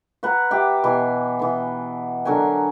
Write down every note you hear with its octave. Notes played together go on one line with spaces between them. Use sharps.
F#4 B4 F#5 A#5
G4 E5
B2 E3 G#5
E3 B3
D3 F#3 A#4 G#5